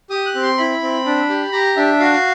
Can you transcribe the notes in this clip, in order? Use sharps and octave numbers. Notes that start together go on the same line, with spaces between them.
G4 D#6
F#6
C4
C6
E4 B5
C4
D4
G4
G4 A#5
D4 E5
F#4 F5